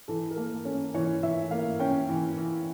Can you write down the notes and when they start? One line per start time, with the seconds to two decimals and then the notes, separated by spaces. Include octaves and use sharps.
0.08 E3 A4
0.31 A#4
0.37 A#3 A4
0.65 C#4
0.94 E3 C#5
1.23 E3 E5
1.51 A#3 F5
1.80 C#4 G5
2.09 E3
2.37 E3